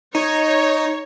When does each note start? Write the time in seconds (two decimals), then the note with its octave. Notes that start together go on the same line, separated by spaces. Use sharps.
0.15 D#4 C#5